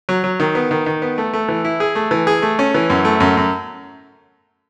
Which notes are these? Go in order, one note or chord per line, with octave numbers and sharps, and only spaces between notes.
F#3
F#3
D#3
B3
D#3
D#3
B3
A3
A3
E3
E4
G#4
A3
E3
G#4
A3
C#4
E3
F#2
A3
F#2
F#2